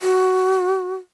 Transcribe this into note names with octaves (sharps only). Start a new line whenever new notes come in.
F#4